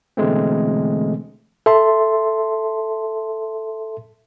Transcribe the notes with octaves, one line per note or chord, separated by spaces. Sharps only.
B2 D3 E3 G#3 A3 C4
A4 E5 A5 C6